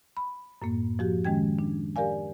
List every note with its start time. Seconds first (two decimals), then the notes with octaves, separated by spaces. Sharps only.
0.17 B5
0.62 F#2 A2 A#3
0.99 F3 F#4 G4
1.25 D#3 G#3 C#4 G5 G#6
1.59 D4
1.96 G4 A#4 D5 F5 G#5